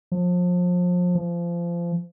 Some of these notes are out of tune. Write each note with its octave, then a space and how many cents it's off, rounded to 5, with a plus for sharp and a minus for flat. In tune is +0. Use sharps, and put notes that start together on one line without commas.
F3 +30
F3 -25